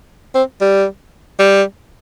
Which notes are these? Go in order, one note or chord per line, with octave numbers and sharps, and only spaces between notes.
C4
G3
G3